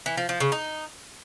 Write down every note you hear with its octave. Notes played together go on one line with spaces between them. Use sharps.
E3
F3
F3
C#3
D#4